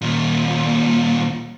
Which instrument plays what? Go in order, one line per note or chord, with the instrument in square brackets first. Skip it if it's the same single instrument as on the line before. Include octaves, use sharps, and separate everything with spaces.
[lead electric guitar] D#2 A#2